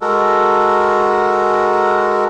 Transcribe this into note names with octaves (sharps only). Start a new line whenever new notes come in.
G#3 F#4 A4 A#4